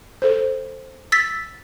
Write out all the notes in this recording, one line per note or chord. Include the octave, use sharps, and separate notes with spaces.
A4 C5
E6 A6 B6